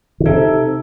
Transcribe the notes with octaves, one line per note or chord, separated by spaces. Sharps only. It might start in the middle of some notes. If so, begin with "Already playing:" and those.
D#3
C3 D#4 A4